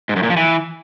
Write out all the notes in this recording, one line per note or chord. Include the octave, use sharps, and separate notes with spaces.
G#2
F#2
A#2
F3
E3